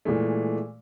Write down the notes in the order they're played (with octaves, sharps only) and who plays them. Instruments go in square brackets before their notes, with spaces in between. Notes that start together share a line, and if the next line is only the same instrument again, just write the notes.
[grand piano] A#2 E3 G#3 A3